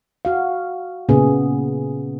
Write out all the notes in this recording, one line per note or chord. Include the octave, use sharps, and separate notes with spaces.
F#4 F5
A#2 C#3 B3 G#4